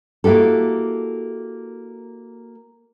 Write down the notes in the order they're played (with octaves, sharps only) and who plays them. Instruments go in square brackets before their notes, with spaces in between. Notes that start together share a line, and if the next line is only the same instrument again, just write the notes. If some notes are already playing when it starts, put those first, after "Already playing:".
[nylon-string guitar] A#3 E4 F#4 G4 A4